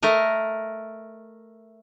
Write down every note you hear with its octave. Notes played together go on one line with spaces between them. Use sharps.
A3 A#4 D#5